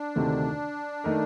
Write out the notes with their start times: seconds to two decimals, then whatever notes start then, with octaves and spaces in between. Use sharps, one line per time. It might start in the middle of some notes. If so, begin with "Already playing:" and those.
Already playing: D4
0.16 D2 C3 D#3 A3
1.04 D#3 A3 D#4 A#4